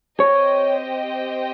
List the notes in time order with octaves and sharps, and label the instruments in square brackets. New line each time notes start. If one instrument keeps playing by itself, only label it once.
[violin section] C4 G4 C5 D#5 G5 [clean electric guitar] C#5